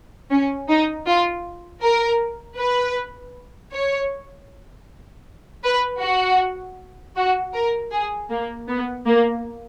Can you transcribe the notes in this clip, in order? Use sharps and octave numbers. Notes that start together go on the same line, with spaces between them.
C#4
D#4
F4
A#4
B4
C#5
B4
F#4
F#4
A#4
G#4
A#3
B3
A#3